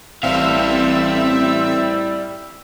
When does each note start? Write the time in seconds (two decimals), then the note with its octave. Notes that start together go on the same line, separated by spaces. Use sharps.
0.23 A1 G3 C4 E4 E5 F5 E6